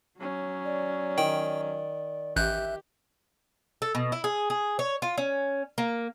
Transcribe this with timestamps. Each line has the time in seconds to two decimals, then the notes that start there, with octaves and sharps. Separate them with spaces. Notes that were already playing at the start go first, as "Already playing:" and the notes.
0.18 F#3 C#4
0.65 D5
1.18 D#3 G5
2.36 A1 G4 E5 F#6 G6
3.82 A4
3.95 B2
4.12 E4
4.24 G#4
4.50 G#4
4.79 C#5
5.02 F4
5.18 C#4
5.78 A#3